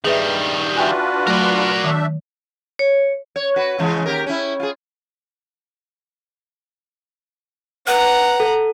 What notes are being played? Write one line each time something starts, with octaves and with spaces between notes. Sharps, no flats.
G2 D#3 G3 G#4 B4 E5
D4 F4 F#4 B4 E5 G5 G#5
F#3 A3 A#4 D5
D#3 A3 D4 E5
C#5
C#5
F#4 B4
C#3 E3 G#3
D#2 G4 A#4
C#4 E4
F4 G#4
B4 F#5 A#5
A4